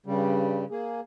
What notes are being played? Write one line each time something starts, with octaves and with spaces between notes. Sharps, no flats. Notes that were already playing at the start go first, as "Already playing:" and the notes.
G2 C#3 G3
A#3 G#4